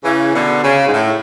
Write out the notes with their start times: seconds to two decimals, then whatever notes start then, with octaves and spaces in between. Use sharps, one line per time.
0.04 C#3 E3
0.33 B2 D3
0.63 C#3
0.87 G#2
0.92 A2